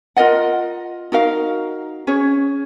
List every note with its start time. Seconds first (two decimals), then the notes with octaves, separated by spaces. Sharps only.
0.17 F4 A#4 D#5 F#5
1.12 D#4 F#4 A#4 F5
2.07 C#4 G#4 C#5